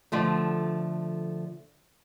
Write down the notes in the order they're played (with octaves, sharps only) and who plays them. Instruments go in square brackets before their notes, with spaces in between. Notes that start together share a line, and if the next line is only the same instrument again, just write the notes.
[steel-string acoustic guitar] D3 F3 A3